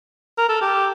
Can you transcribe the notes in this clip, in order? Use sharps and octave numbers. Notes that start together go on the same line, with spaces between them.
A#4
A4
G4